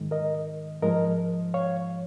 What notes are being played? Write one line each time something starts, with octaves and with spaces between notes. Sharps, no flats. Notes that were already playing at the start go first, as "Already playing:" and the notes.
Already playing: G#2 D#3 G#3
A#4 D#5
G#2 F3 G#3 A#4 D#5
C#5 F5